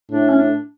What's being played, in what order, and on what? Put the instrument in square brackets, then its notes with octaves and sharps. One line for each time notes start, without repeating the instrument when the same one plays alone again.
[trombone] A2 [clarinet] D4
[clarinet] C#4
D4